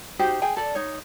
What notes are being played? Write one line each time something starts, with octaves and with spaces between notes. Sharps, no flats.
D#4 F#4 G4 C5
G#4 G5 G#5
A4 D5
D#4 C#5